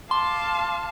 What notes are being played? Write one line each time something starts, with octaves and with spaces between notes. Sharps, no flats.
F5 A5 C6 D6